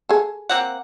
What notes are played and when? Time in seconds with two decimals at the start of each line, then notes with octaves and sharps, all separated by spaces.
0.09 G#4 A4
0.49 A#3 C4 F#5